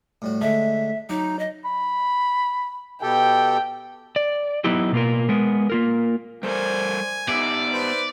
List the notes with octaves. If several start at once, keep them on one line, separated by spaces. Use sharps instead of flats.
A2 G3 F#4
D3 G#3 A3 E5
F#3 D#4 D6
D#5
B5
B2 G4 A4 G5
D5
F#3 B3 D#4 E4 G4
B2 A#3 F4 A#4
G#3 B3 A#4
A#3 F4 A#4
G3 A4 A#4 C5 D5 G#5
B3 D#4 G4 D5 E5
B4 C5